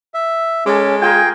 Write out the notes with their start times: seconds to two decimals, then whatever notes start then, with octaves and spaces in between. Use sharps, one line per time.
0.14 E5
0.66 G#3 C#4 A4 D6
1.02 F4 G#4 A#4 G5 G#5